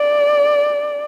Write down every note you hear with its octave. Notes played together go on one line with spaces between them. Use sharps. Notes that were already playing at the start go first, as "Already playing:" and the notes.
Already playing: D5